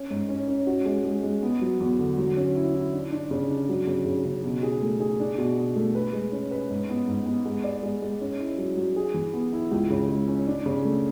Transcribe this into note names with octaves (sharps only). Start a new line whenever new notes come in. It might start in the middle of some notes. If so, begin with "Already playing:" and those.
Already playing: C#4
G#2
C#4
C#4
F#4
G#3
G#3
G#3
B3
F#3
E2
D3
F#3
C#4
E4
E4
D4
D4
C#3
D4
F#3
C#3
C#3
C#3
B2
G#4
A3
G#4
D4
B2
B2
A3
B4
G#3
C#4
B4
G#2
B3
G#2
B3
G#3
D5
G#3
G#3
C#4
E4
F#3
F#3
G#4
E3
B3
E4
C#2
C#3
G#3
C#4
D4
C#3
A3